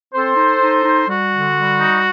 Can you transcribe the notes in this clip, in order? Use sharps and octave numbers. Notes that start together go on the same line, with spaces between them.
C4 A4 C5
D#4
D#4
D#4
G3 F#4
D3
G3
D#4